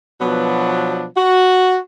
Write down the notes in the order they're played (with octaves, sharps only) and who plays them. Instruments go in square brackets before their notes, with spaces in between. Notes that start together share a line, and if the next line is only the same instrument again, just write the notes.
[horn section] B2 F3 F#3 B3 D4
F#4